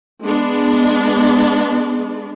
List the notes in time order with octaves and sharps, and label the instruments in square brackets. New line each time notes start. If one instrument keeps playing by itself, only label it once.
[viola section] G#3 B3 D4